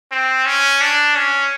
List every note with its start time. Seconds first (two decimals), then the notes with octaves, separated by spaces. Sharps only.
0.12 C4
0.46 C#4
0.81 D4
1.15 C#4